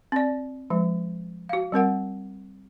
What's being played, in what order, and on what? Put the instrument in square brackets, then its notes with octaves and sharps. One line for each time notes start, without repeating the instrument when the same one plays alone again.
[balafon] C4 D5
F3 G#3
F#4 F5
G3 C4 A#4 F#5